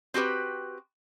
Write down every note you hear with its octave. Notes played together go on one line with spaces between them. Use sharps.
C4 F#4 G4 B4